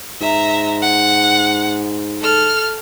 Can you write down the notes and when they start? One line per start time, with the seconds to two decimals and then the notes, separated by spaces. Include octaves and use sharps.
0.21 G#2 E5 A#5
0.82 F#5
2.21 A4 F6